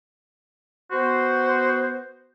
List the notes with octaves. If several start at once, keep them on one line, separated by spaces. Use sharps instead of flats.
B3 F#4 C5